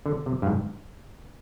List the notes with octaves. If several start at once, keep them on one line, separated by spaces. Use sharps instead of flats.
D3
C3
G2
G#2